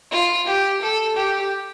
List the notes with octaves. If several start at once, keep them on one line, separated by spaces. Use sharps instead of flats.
F4
G4
A4
G4